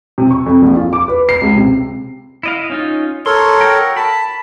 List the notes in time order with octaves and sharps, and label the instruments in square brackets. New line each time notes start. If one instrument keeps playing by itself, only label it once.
[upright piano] C3
C#6
F2
A#1
F4
D6
B4
C7
C#2
C3
[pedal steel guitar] E4 D#5 F5
C#4 D#4 F4
[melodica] A4 A#4 C#5 [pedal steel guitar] C6
[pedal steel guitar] F#4 G5 A#5
[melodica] A5 [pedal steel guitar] B5